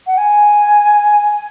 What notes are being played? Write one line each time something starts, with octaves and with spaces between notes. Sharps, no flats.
F#5
G#5